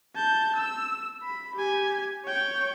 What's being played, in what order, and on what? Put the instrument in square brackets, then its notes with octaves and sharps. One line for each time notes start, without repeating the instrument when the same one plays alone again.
[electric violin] A5 G6
E6
B5
G4 G#5
C#5 G5